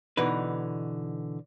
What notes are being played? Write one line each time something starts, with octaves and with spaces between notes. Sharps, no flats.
B2 D3 E3 D#4 B4